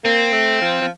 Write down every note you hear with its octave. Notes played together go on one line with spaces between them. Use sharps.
A#3 C4
A3
F3
F3